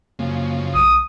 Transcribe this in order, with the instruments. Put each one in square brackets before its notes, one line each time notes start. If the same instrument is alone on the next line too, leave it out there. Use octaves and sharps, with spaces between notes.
[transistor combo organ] F#2 C#3 F3 [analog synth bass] A#3
[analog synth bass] B1 [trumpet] D#6